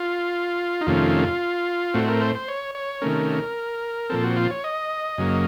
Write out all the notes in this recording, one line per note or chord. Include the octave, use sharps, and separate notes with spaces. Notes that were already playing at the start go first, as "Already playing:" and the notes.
Already playing: F4
D#4
F2 C3 D#3 A3 C#4 F4
A2 A3 C4 F#4
A#4
C5
C5
C#5
C#5
C3 D#3 A3 C#4 A#4
A#2 F3 C4 A4
F#4
F4
C#5
D#5
F#2 C#3 F#3 A#3